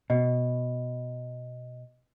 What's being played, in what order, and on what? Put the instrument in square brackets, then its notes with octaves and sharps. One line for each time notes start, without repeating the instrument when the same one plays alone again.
[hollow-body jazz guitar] B2 [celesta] D#5